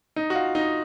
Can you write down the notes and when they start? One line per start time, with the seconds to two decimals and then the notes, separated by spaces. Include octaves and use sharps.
0.16 D#4
0.30 F#4
0.35 F4
0.55 D#4